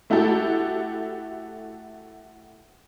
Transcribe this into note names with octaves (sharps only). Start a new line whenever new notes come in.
A3 E4 F#4 G4 A4